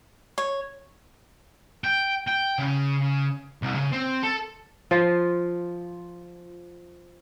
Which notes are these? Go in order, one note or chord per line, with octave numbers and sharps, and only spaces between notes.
C#5
G5
G5
C#3
C2
C#3
C4
A4
F3 F4